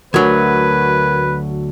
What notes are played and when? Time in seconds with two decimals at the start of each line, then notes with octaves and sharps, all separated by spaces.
0.14 D2 F#3 A3 A#4 B4 G#6